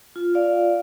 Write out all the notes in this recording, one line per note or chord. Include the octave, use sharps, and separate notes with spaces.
F4
D5 F5